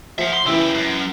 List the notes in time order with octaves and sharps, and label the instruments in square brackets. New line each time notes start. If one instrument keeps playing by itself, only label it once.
[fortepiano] F3 [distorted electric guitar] E5 F#5
[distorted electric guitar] C6
[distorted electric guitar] C#3 G4 [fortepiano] E3 E4 E5
[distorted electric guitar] F#2